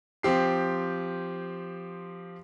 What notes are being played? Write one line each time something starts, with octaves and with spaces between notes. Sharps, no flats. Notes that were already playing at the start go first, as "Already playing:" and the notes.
F3 C4 G4 C7